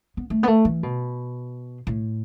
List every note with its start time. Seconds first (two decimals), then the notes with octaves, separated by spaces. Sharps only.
0.17 B3
0.30 A3
0.43 B3
0.47 A3
0.65 E3
0.83 B2
1.87 A2